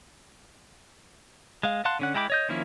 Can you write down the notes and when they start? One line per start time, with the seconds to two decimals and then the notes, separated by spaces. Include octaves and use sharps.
1.63 G#3 F5
1.85 F5 F#5 A5 C6 F#6
1.99 D3 C#4 F#5
2.14 G#3 E4 G5 B5 D6
2.30 C#5 D#5 G6
2.49 D#3 F3 A#3 C#4 E4